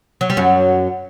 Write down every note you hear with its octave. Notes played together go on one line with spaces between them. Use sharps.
F#3
G3
F#2 F#3